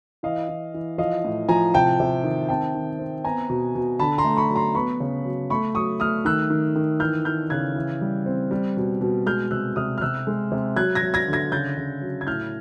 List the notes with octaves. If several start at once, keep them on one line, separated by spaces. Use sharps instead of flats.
E3 D#5 F5
E3
E3
F3 D#5 F5
A2
F3 G#5 A#5
C3 G5 A5
C3
D#3
C4 G5 A5
D#3
C4
B3 G#5 A#5
B2
B2
D3 A5 B5
A#5 C6
A3
B5 C#6
F#3
A#5 C6
B3 B5 C#6
C#3
F#3
A3 B5 C#6
F#3 C#6 D#6
A3 D#6 F6
D#3 E6 F#6
D#3
D#3
E3 F6 G6
E3 F6 G6
C#3 F#6 G#6
E3
G3
C4
G3
B2
B2
G#3 F6 G6
C3 E6 F#6
C3 D#6 F6
F6
C3 E6 F#6
G#3
C3
F#3 F#6 G#6
G#6 A#6
F#3
G#6 A#6
D3
G#6 A#6
C#3 G6 A6
C#3
F#3
G#6
A2 F6 G6